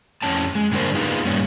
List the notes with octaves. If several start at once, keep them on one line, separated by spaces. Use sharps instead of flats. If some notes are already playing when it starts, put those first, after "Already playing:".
F2 A2 C#4 A5
G#3
G2 D3 D4 A#4 C5
B3 D#4 F4 G#4 B4
G2 A#2 G3 B3 C#4